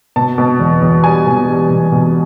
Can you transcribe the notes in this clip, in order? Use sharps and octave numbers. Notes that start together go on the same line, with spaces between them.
B2 A5
B2
E2
E2
G3 G#5
B2
G3
B2
B2